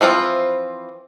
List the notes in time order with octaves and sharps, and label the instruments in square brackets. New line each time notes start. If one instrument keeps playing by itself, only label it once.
[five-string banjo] E3 F3 C4 F4